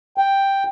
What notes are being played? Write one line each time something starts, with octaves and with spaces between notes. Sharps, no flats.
G5